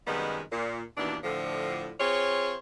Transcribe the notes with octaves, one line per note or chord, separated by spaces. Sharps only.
F#2 C3 D#3 G3 G#3 B3
A#2
D#2 B2 E3 D4
A2 D3 F3
C4 F4 G#4 C5 C#5